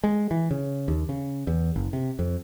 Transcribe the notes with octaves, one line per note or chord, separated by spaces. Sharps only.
G#3
E3
C#3
D#2
C#3
E2
F#1
C3
F2